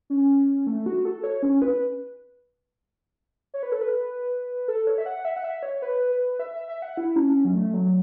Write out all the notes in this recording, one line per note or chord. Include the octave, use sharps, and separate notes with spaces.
C#4
A3
F#4
A4
C#5
C#4
B4
C#5
B4
A4
B4
A4
C#5
E5
F#5
E5
F#5
E5
C#5
B4
B4
E5
E5
E5
F#5
E4
C#4
C#4
F#3
A3
F#3
F#3